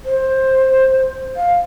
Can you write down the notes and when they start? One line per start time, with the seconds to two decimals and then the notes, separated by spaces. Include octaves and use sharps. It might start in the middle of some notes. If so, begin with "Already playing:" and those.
0.05 C5
1.36 F5